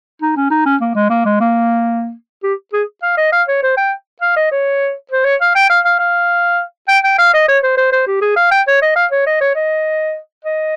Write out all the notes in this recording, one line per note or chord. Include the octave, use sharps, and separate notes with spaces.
D#4
C#4
D#4
C#4
A#3
G#3
A#3
G#3
A#3
G4
G#4
F5
D#5
F5
C#5
C5
G5
F5
D#5
C#5
C5
C#5
F5
G5
F5
F5
F5
G5
G5
F5
D#5
C#5
C5
C5
C5
G4
G#4
F5
G5
C#5
D#5
F5
C#5
D#5
C#5
D#5
D#5